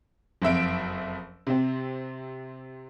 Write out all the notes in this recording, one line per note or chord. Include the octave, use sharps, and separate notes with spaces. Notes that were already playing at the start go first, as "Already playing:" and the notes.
F#1 F2 E5 D7
C3 C4